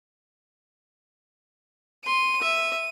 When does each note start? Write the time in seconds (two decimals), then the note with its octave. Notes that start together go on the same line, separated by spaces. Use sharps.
2.06 C6 D#7
2.42 E5